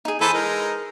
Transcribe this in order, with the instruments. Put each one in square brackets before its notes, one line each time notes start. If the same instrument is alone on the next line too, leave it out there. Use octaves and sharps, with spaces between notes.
[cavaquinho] D#4 G#4
[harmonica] E3 A4 C5 [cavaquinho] B4 G#5 A#5
[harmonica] G#3 D#4 A#4